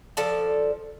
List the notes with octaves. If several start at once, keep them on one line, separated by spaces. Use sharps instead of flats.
F3 A4 D5 A5